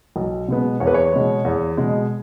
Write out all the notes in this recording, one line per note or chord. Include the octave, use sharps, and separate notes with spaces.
B1
B2 G#3 B3
E2 C#5
B4
C#5
B2 G#3
E2
B2 G#3